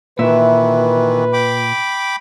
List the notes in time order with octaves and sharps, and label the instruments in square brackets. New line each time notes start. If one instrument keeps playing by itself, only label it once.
[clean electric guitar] A#2 [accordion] D#3 E3 [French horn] B4 [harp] E5
[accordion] G5 B5 D6